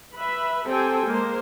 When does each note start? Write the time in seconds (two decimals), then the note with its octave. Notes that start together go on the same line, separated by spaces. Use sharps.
0.17 B4 E5 B5
0.67 C4 G4 A4 C5 G5 G#5
1.08 G#3 A#3 A#4 C5